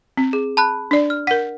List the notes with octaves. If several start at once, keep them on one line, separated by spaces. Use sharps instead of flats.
C4
G#4
A5 B5 F#6
D4 D5
F6
A#4 F#5 B6